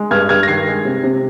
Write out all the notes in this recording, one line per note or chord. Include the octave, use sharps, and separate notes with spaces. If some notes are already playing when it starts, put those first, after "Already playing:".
Already playing: G#3
G2 F6 G#6
G2 F6 G#6
A#6
D#3 G#6 C7
G#3
C3
C3